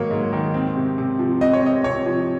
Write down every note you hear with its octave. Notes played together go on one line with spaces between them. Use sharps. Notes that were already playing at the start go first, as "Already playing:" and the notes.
Already playing: G#2 D#3 F#3 A#3 C#5
G#2
D#3
C4
C3
C3
F3
C4 D#5
C#5
C3 D#5
C3 C#5
F3